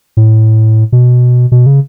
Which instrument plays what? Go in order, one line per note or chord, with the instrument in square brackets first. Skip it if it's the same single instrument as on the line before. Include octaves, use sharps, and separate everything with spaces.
[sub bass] A2
B2
B2
C#3